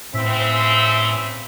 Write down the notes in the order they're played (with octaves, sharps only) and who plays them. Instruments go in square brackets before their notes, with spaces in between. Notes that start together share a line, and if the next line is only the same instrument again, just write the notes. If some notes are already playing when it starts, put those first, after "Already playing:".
[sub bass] A2 [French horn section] C#3 E3 C4 [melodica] E5